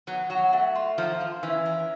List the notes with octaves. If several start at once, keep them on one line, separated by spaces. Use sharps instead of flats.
F#3 B3
F#3 F#4
A3
F4
F3 A#3
F4
E3 C#4
A#4